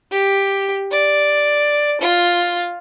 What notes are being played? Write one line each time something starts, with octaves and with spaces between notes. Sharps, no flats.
G4
D5
F4